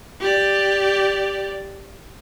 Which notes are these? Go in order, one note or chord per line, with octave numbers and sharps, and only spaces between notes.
G4 D5